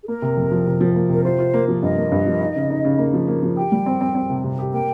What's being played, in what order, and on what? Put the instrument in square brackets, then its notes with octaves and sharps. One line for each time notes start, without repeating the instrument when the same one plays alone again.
[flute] G#4
[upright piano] A#3 [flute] A#4
[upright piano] C3
F2
F3
C3
F3
A#3
[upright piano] C3 [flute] A#4
[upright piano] F4 [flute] C5
[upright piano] F4
A#3
F3
[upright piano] G2 [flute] D#5
[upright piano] A#3
G2
F3
D#4
C#3
D#4
C#3
A#3
F3
A#3
F3
[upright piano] G4 [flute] G5
[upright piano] G3
C4
C4
C4
C3
C3
G4
[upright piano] A#3 [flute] G5